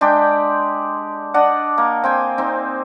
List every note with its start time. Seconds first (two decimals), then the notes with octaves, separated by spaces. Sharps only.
0.01 G#3 D4 G4 G5
1.34 D4 D5 D#5 F#5
1.78 A#3
2.04 C4 G5 G#5
2.38 C4 D#4